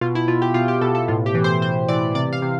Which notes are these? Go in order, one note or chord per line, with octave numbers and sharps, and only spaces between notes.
B2 F4
E4
B2 F4
G4
B2 F4
G4
B2 A4
A4
A2 F4
G4
E3
C5
E3 C5
E3 D5
C3 D5
F5
C3